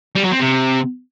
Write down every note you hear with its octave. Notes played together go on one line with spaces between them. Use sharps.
G3
F#3
C4
C3